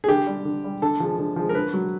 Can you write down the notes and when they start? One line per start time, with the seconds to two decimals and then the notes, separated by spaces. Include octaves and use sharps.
0.04 G#4
0.08 D3 G4
0.27 G3
0.45 D3
0.64 G3
0.82 D3 A4
1.00 F3 G#3
1.18 D3
1.36 F3 G#3
1.49 A#4
1.55 D3 B4
1.73 F#3